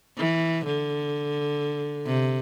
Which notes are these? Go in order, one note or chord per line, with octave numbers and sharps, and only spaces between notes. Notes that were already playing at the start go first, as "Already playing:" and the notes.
E3
D3
C3